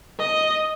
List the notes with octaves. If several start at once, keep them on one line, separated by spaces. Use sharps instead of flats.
D#5